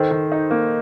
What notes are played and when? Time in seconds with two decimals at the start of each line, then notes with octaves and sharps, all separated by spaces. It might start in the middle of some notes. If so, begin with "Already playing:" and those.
Already playing: D#3 A4 C5
0.11 D#3
0.32 D#4
0.51 A#3